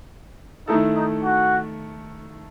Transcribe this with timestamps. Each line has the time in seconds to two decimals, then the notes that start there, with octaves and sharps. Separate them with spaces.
0.67 D#3 A3 D#4 E4 A4
0.96 D#4
1.24 F#4